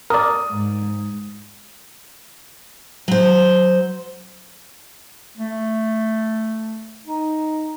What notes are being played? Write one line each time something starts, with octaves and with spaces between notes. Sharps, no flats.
A#4 D5 D#6
G#2
F#3 C5
A3
D#4